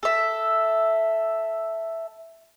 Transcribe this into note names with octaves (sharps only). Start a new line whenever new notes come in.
A4 E5